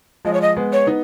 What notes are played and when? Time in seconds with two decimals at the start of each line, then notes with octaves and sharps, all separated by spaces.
0.25 F3 G#3 D#5
0.33 C#5
0.41 D#5
0.57 G#3 B3
0.72 C#5
0.86 B3 D#4